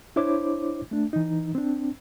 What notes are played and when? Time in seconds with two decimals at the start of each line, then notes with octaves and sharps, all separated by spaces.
0.16 D4 E4 C5 C#5 D6
0.91 A3 D4
1.13 E3 D#4
1.55 C4 D4